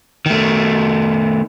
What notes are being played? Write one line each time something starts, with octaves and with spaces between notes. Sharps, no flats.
D#3 A3